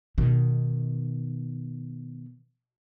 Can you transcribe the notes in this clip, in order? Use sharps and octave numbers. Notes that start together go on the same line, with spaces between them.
B2 D#3